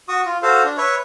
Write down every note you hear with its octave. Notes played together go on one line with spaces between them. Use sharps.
F#4 C#6 D#6
F4
F#4 A4 C5 F5
D4
B4 C#5 E5 C#6